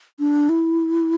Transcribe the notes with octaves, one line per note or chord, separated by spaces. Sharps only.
D4
E4